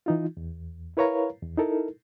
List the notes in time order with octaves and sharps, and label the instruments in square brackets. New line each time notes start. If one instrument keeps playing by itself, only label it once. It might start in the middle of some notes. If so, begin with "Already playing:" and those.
[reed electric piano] E3 D#4 F4
E2
E4 A#4 B4 C#5 F5 A#5
E2
D#4 E4 A4 A#4